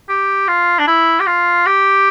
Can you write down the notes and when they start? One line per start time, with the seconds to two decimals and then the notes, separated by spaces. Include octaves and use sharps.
0.09 G4
0.48 F4
0.79 D4
0.87 E4
1.20 G4
1.26 F4
1.66 G4